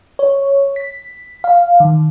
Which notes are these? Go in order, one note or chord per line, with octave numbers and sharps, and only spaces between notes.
C#5
B6
F5
D#3